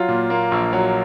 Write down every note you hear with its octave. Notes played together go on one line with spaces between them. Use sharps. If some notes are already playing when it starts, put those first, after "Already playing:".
Already playing: F#3 F4
A#2
A#3
A#1
F#3